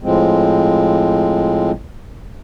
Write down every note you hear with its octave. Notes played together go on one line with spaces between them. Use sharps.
A2 F3 G#3 C4